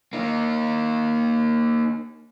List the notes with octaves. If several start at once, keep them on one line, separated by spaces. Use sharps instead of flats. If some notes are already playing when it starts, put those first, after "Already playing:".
A#3 D#4